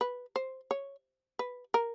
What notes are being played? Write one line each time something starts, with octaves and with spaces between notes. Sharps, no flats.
B4
C5
C#5
B4
A#4